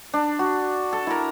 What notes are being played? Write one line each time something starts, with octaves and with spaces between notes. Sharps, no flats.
D4
F#4
A4
E4 A#4